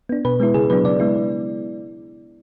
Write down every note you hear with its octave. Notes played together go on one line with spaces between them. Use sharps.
B3 D4
B2 B4
G#3 B3 E4
C#3 G#4
F#3 B3 D4 B4
C#3 D5
G#3 B3 E4